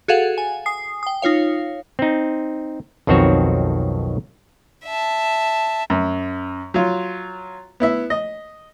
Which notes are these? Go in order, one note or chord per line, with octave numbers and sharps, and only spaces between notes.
F#4 G#4 A4 F5 F#5
G#5
G#5 D#6 C7
G5 D#6
D#4 F4 C#5 F5
C4 D#4
B1 F2 D#3 C4 F#4 C#5
E5 A5
F#2
F#3 F4
B3 E4 E5
D#5